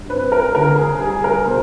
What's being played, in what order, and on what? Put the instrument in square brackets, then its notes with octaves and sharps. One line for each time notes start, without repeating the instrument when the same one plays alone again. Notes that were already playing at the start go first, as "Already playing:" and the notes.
Already playing: [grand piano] G2
C4 B4
A#4
D3 A#4
G#4
G3 G#4
A#4
B2 C5